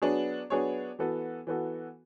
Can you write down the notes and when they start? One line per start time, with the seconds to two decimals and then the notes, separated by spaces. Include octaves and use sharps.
0.02 F#3 B3 D4 G#4 C#5
0.50 F#3 B3 D4 G#4 C#5
0.99 E3 B3 F#4 A4
1.47 E3 B3 F#4 A4